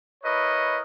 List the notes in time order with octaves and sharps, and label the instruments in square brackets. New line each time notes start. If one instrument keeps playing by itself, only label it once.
[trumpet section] E4 A#4 B4 C#5 D#5